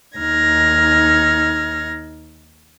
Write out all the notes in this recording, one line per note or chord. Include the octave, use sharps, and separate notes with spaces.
D#2 D#4 F6 G#6 A#6